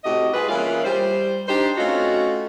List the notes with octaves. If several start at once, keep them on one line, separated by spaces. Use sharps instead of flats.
A2 C3 F#4 G4 D#5
G3 F4 G#4 B4
E3 G#3 A#3 C#4 E4 F4
G3 C5
D4 D#4 G4 C5
A3 C4 C#4 D#4 F4 F#4